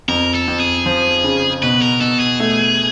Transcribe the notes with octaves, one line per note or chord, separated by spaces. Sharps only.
F2 A#4
A4
F2
G#4
F3
C#3
B2 B4
A#4
B2 A4
G#4
A3